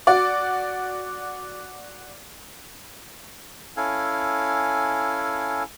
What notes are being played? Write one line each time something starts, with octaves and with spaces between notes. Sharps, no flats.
F#4 D5
C#4 E4 A4 F5 G#5